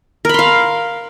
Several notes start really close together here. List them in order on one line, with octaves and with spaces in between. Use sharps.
A#4 B5 C6 F5